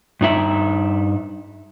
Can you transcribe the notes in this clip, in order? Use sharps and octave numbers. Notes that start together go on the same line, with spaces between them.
G2 D#4 E5